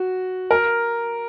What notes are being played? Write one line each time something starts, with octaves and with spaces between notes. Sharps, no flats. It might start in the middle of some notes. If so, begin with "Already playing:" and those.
Already playing: F#4
A#4